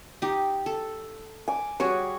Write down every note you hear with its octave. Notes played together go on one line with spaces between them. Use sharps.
D#4 G4
A4
G#5 D6
G3 F#4 G#4 C#5